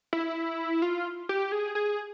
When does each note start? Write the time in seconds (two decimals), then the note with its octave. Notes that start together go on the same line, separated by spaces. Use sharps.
0.13 E4
0.82 F4
1.29 G4
1.52 G#4
1.75 G#4